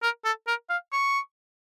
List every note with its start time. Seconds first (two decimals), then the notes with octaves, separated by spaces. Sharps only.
0.03 A#4
0.25 A4
0.47 A#4
0.70 F5
0.93 C#6